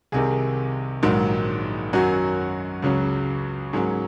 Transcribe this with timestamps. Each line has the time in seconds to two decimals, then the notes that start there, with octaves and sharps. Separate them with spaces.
0.12 C2 C3 D#3 G#4
1.03 A#1 G#2 D#3 F#3
1.93 F#2 D#3 F#3 F#4
2.82 C#2 C#3 F#3 C#4
3.73 G#2 F#3 A#3 C#4 G#4